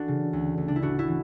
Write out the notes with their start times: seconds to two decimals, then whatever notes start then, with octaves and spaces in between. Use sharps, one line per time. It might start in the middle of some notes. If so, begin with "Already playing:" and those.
Already playing: E3 D4 F#4 A4
0.08 C#3
0.33 D2
0.58 D2
0.68 D4
0.76 E4
0.82 A1 D4 F#4
0.99 E4
1.08 E3